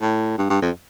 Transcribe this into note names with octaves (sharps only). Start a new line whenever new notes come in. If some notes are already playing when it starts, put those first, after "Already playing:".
A2
G2
G2
F2